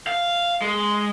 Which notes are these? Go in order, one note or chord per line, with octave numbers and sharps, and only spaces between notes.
F5
G#3